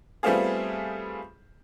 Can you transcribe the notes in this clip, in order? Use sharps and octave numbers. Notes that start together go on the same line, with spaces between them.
G3 A3 B3 C4 F4 G#4